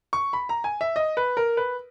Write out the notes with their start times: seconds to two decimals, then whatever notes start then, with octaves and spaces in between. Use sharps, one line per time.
0.13 C#6
0.33 B5
0.49 A#5
0.64 G#5
0.81 E5
0.96 D#5
1.17 B4
1.37 A#4
1.57 B4